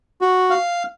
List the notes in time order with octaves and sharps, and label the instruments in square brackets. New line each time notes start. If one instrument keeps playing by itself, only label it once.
[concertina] F#4
F5